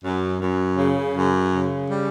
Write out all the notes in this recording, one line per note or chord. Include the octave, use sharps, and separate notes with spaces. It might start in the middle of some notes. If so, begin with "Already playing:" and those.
F#2
F#2
C#3
F#2
C#3
G3